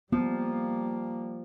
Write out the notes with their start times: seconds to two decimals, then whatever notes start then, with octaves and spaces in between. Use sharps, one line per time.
0.12 F3 G3 A#3 B3